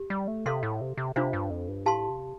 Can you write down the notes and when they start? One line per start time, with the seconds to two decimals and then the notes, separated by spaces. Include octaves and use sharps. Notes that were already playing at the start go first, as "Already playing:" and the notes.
Already playing: G4
0.10 G3
0.27 A3
0.46 C3 A4 F5 C6
0.63 A2
0.81 C3
0.97 C3
1.16 C3 D4 F4 C5 F5
1.33 G2
1.50 F2
1.68 G2
1.86 A2 G4 F5 A5 C6
2.09 C3